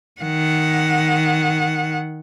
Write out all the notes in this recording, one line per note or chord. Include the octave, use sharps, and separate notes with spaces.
D#3 F#5